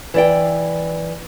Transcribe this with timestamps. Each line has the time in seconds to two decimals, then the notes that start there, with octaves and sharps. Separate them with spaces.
0.14 E3 D5 G5